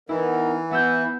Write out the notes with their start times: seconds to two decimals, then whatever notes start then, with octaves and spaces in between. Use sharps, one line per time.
0.09 E3 B3 D#4 E4 A#4
0.71 B3 B4 E5 F#5 E6 G6